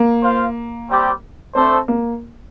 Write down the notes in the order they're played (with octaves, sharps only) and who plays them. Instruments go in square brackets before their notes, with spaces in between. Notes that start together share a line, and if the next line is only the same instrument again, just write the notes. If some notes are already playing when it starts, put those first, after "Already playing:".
Already playing: [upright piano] A#3
[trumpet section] F4 C5 F5
G3 C4 G4 D5
[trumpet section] A3 D4 A4 C5 [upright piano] C4
[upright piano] A#3